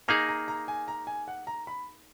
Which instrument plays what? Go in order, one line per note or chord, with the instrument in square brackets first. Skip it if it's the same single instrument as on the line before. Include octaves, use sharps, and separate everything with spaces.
[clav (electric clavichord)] A#3 D#4 G#4 [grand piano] A#5
[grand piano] A#5
A#5
G#5
A#5
G#5
F#5
A#5
B5